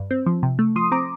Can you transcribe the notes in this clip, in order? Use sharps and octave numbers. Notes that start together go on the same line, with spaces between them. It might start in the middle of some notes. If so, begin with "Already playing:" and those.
Already playing: G2
C4
F3
C3
A3
F3 C6 D#6
C4 A#5 D6